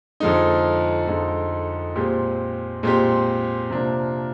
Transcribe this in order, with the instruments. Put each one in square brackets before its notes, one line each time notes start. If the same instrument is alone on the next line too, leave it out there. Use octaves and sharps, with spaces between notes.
[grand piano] F2 D3 F3 G#3 D#4
F2 D3 F3 G#3 D#4
A#2 G#3 C4 G4
A#2 G#3 C4 G4
C3 F3 A#3 D4